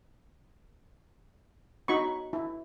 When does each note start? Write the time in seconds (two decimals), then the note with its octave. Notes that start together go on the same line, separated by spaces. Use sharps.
1.88 D#4 F#4 B5 C#6
2.33 E4